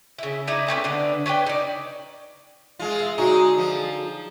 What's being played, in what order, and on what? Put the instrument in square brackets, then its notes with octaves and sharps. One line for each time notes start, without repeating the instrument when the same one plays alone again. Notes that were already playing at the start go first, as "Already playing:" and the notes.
[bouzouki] C#3 E4
D#4 E4 D5 D#5
A3 C4 C#4 B4
D3 B3 D5
C#4 B4 D5 G5
D#4 D5
[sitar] G#3 F4
[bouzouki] E5
[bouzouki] D3 F#3 G#4 [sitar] G#3 D#4
[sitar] F3